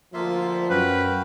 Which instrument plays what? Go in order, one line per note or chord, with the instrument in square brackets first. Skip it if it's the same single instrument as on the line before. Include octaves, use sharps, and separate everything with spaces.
[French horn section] D2 F3 [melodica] A#3 F4 E5
[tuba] F#2 [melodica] F#4 F5 G5 [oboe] B4